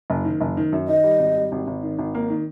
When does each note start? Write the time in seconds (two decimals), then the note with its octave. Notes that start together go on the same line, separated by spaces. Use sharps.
0.10 F#1
0.25 D#3
0.41 F#1
0.57 D#3
0.73 F#2
0.88 D#3 D#5
1.04 G3
1.19 G#1
1.36 G3
1.52 G#1
1.67 G#1
1.83 D#3
1.99 G#1
2.15 A#3
2.30 D#3